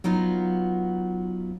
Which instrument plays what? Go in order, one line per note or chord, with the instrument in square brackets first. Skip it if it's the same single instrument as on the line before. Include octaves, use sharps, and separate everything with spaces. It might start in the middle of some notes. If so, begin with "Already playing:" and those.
[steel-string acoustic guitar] F#3 B3 D#4 F4 F5